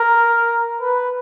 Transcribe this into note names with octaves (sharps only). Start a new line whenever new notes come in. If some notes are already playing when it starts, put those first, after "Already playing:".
Already playing: A#4
B4